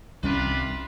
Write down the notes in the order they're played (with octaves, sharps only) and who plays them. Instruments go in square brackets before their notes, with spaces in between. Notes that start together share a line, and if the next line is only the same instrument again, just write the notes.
[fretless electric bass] C2 G3 C#4 [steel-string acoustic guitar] C3 D#3 [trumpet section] D4 F4 B4